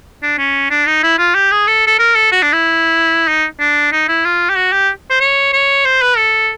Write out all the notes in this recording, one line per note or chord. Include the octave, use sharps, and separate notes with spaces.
D4
C#4
D4
D#4
E4
F4
G4
G#4
A4
A4
A#4
A4
F#4
D4
E4
D#4
D4
D#4
E4
F4
G4
F#4
G4
C5
C#5
C#5
C5
B4
A4